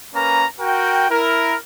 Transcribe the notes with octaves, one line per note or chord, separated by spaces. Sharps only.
A#3 C#4 A#4 B4 A#5
F#4 A#4 G5
E4 A#4